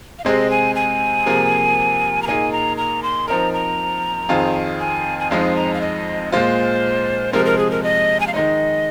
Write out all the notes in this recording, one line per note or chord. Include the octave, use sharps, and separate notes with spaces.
F5
C3 G#3 C4 G#4 D#5
G#5
G#5
C3 F3 A#3 G#4
A#5
A#2 A#3 D#4 G#4 G#5
A#5
A#5
C6
F3 C4 D#4 A#4 A#5
A#5
F2 D#3 C4 F4 G#4
G#5
G#5
F2 F3 G#3 C4 D#4 F5
A#5
F5
D#5
A#2 G#3 F4 C5
C3 F3 G#3 C4 A#4
A#4
G#4
A#4
D#5
G#5
F5
D#3 G#3 D#4 D#5